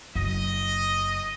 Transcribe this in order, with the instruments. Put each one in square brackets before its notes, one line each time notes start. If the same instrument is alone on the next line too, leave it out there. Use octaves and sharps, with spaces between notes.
[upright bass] F#1 [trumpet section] D#5